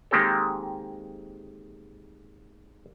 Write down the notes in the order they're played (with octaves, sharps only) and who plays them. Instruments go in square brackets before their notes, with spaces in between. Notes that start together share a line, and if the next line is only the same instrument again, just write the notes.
[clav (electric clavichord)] D#3 G#3 A#3 C4 G4 A4